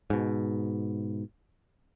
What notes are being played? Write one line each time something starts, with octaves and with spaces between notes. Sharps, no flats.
G#2 B2